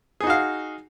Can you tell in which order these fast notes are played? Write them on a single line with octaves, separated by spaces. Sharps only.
G#4 D#4 F#4 F5